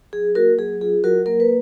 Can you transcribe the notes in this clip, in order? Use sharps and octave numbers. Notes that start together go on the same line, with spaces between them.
F#3 G#4
A#3 F#4 A#4
F#3 G#4
F4 G#4
F#3 F#4 A#4
A#3 A#4
B4